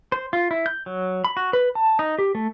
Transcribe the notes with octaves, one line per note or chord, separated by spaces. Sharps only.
C5
F4
E4
G6
F#3
B5
F#4
B4
A5
D#4
G4
A3